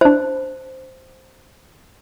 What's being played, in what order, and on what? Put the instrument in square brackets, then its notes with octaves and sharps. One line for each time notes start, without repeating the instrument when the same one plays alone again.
[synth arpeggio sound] D4 E4 [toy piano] C5